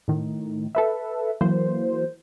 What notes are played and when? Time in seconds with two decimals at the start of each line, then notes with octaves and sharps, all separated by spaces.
0.08 A2 D#3
0.75 A4 B4 E5
1.41 E3 F#3 A#3 C5